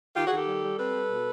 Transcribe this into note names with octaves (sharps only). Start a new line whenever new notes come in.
D#3 F4 G4
F#4 G#4
D#3 G4 A4
G3
G3
C4 A4 B4
G3
B2